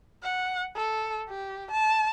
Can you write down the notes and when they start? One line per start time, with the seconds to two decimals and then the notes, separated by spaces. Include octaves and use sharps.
0.23 F#5
0.76 A4
1.29 G4
1.71 A5